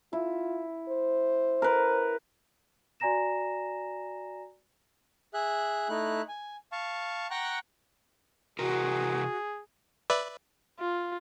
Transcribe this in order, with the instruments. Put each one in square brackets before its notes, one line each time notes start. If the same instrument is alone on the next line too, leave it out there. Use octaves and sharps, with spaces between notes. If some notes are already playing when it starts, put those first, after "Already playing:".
[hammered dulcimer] E4 [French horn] F4
[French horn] C5
[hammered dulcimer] A#4 B4
[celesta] F#4 D5 G#5 A#5 A#6 E7
[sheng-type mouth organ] G#4 E5 F#6
A3 D#4 E4 F#6
G#5
F5 A5 C#6
F#5 G5 A#5 C#6 F#6
[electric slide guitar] C3 E3 A#4 [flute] F#4 [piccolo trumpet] G#4
[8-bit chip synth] B4 D5 E5
[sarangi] F4